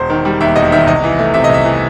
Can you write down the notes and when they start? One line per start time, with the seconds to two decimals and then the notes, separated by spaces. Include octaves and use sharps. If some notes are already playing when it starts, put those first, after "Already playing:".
Already playing: E1 C5
0.10 D#3
0.25 G3
0.41 D#2 E5
0.56 E1 D#5
0.72 D#3 E5
0.87 C2 D#5
1.04 E3
1.19 A3
1.34 C3 E5
1.44 D#5
1.49 C2 E5
1.65 E3